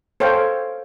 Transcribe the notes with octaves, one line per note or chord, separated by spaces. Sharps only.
A4 C5 C#5 F5 G5